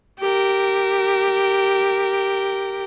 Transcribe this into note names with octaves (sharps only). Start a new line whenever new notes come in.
G4 A#4